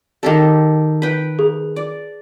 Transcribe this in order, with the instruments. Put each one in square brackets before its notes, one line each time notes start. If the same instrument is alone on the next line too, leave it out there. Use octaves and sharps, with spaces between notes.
[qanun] D#3 G4 A4
B4 G5
[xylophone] G#4
[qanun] D5